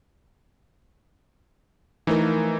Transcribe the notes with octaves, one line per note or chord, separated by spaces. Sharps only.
E3 F3 A3 D#4 A#4